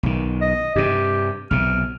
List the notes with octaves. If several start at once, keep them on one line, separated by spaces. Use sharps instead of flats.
B1 D#3
D#5
G2 C3 G4
B1 C3 F6